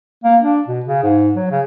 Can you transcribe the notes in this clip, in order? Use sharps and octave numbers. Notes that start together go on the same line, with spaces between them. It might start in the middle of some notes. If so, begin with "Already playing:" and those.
A#3
D4
B2
C#3
G#2
F#3
C#3